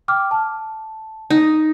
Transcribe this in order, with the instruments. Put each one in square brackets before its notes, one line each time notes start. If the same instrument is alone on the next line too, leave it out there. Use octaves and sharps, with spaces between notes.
[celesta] G5 D6 F6
A5
[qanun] D#4